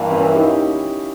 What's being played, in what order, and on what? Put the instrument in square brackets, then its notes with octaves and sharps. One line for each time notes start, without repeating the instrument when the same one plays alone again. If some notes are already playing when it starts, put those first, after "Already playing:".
Already playing: [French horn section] G2 E3 A#3
[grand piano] C#4 E4
D#4 G4